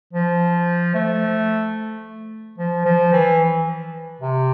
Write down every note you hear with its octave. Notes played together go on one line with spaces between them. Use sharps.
F3
A3
F3
F3
E3
C3